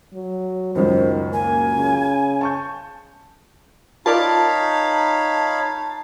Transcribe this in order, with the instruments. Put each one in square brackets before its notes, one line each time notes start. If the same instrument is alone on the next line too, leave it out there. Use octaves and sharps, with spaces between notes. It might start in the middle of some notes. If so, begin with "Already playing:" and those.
[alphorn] F#3
[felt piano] C#2 F#2 [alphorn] D#3 [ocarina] C5
[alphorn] A#3 [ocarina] G#5
[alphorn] C#3
[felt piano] A5 C#6 G6
[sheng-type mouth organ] D#4 [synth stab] F4 A#4 D5 [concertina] C#5 F5 B5 [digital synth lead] A5